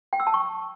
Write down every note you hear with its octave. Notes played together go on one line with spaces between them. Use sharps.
G5
E6
A5
C#6